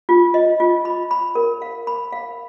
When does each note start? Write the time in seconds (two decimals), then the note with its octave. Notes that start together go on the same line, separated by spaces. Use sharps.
0.09 F4
0.34 D#5
0.60 F4
0.85 B5
1.11 B5
1.35 A#4
1.62 F5
1.87 B5
2.12 F5